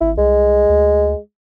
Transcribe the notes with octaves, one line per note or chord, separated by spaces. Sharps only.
G#1 E4
C2 G#3
D2